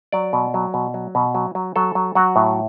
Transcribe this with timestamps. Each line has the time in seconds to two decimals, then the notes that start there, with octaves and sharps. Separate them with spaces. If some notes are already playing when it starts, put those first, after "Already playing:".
0.12 F#3 D5
0.33 B2
0.54 F#3
0.74 B2
0.94 F#3
1.15 B2
1.35 F#3
1.55 F#3
1.76 F#3 A4
1.95 F#3
2.15 F#3 F#4
2.36 A2